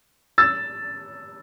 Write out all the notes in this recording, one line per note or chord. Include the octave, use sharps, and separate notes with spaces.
E6 A6